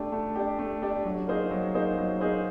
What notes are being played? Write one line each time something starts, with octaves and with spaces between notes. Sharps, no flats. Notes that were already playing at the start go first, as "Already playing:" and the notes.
Already playing: A3 D4 G4
A3
D4 G4
A3
D4 G4
F#3
A#3 D#4 G#4 C5
F#3
A#3 D#4 G#4 C5
F#3
A#3 D#4 G#4 C5